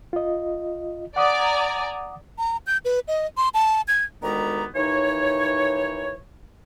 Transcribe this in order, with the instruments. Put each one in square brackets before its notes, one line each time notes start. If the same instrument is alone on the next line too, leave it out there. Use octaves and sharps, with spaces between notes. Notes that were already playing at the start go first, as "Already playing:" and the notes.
[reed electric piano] F4 D#5
[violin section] D5 G#5 A#5 [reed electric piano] F#5 D6 D#6
[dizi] A#5
G6
B4
D#5
C6
A5
G#6
[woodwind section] D2 D#3 G#3 B3 G4 A#5
D#2 E3 D#4 C#5